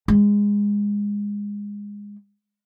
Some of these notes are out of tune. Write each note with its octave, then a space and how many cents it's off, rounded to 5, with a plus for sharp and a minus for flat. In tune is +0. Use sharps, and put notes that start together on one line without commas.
G#3 -20